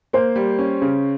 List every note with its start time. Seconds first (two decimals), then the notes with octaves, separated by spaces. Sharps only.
0.13 A#3 C5
0.36 G3
0.59 C#4
0.82 C#3